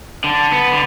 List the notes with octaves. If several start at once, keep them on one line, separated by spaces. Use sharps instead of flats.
D3
B3
D3